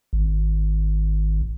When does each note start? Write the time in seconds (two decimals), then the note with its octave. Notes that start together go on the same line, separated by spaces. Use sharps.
0.13 G#1